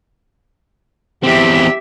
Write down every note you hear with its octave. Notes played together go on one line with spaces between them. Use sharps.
E2 C4 G4 E5